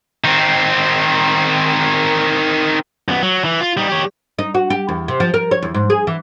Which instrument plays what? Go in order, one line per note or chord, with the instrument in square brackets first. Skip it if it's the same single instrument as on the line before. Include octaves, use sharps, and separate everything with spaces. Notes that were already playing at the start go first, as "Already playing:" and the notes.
[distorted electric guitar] D#3 C4
[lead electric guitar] F#2 B3
F#3
E3
F4
G3 D#4
G4 C#5
[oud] D#4
F#4
G4
E2
C3
F3
A#4
C#5
E2
G#2
G#4
E3